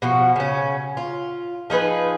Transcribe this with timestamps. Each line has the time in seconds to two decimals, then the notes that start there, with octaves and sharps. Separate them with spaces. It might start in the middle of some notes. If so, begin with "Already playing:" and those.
0.02 B2 F3 F#4
0.36 C#3 C#4
0.97 F4
1.70 F3 D#4 G#4 B4